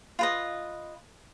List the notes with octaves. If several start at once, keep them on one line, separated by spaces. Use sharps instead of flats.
F4 B4 D#5